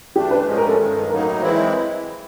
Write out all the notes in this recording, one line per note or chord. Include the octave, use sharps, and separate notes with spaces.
E3 A3 D4 G4
B4
A2 F3 G#3 C#4
A#4
A4
G2 D#3 G#3
A2 F#3 A#3 D#4 A#4
E3 G#3 C4 E4